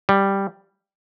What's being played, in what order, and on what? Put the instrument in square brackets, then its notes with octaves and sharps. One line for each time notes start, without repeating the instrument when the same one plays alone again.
[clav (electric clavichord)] G3